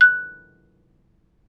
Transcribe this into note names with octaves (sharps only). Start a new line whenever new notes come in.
F#6